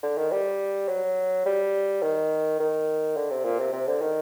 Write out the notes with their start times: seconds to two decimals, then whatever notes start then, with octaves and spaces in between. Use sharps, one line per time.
0.03 D3
0.17 D#3
0.32 G3
0.88 F#3
1.45 G3
2.02 D#3
2.60 D#3
3.16 D3
3.30 C3
3.45 A#2
3.59 C3
3.73 C3
3.87 D3
4.01 D#3